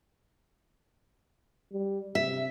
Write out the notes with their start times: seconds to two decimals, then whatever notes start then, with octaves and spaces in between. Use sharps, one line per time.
1.72 G3
2.15 C3 E5